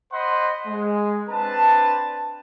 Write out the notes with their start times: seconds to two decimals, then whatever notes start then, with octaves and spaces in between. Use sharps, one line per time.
0.13 C5 D#5 F#5 B5 C6
0.68 G#3
1.30 C4 D4 B4 A5